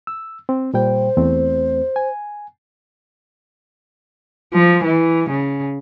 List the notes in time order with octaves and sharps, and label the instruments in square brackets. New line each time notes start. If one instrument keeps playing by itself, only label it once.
[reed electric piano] E6
C4
[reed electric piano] A#2 G3 G5 [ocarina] C5
[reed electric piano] E2 A3 C4
G#5
[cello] F3
E3
C#3